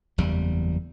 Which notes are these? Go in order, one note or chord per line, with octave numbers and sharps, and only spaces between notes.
F#1 E2 G3